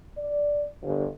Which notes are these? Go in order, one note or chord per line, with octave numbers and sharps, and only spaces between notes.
D5
G1